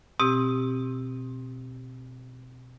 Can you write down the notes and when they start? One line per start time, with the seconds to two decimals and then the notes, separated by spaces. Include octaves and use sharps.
0.20 B2 C4 G4 E6